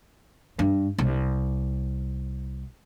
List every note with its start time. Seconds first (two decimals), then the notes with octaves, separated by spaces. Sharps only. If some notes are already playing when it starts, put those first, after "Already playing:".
0.59 G2
0.99 C2